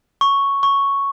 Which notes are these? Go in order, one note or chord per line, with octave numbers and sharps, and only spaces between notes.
C#6
C#6